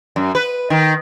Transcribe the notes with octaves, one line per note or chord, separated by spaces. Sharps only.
F#2
B4
D#3